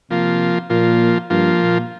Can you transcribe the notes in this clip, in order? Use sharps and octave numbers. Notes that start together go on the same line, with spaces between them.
C3 F3 A#3 F4
A#2 F3 A#3 F4
G2 F3 A#3 F4
A#2